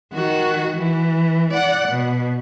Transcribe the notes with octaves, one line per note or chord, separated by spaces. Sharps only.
D#3 F#4
E3
D5 F#5
B2